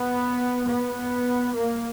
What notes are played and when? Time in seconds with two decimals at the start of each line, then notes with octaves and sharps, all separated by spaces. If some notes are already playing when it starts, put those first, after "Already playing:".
Already playing: B3
0.65 B3
1.55 A#3